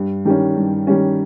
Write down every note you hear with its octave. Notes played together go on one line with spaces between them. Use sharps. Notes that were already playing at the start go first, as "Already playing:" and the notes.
Already playing: G2
D#3 G3 C#4
G2
D#3 G3 C#4